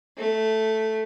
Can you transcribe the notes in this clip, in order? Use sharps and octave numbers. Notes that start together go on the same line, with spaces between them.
A3